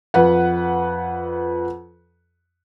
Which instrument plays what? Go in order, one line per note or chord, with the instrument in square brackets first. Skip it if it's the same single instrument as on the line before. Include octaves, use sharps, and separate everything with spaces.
[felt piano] F2 B4 F#5